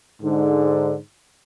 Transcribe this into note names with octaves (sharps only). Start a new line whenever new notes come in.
G#2 D3